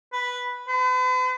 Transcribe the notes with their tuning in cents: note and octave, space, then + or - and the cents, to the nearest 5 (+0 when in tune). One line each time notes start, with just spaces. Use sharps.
B4 -5
B4 +45